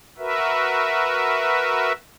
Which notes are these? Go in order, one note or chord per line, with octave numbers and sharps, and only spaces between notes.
F#4 A#4 B4 E5